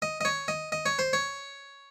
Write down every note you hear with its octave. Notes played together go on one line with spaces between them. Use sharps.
D#5
D#5
C#5
D#5
D#5
C#5
C5
C#5